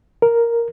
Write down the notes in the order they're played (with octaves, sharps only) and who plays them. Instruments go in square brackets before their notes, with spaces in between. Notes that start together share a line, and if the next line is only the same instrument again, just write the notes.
[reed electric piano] A#4